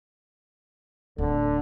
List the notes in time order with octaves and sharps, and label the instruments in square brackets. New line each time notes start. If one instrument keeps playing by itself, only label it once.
[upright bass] D1 [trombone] D3